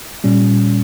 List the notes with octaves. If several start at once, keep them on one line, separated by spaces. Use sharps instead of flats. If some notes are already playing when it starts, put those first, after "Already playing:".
A#2 G3 C#4